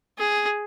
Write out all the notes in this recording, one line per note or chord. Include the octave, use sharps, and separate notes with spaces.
G#4